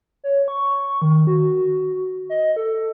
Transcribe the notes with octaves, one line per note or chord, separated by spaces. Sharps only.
C#5
C#6
D#3
F#4
D#5
A4